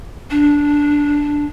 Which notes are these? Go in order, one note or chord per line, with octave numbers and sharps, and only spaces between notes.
D4